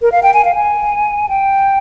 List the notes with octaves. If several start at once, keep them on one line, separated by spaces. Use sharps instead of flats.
A#4
F5
G5
G#5
F5
G#5
G5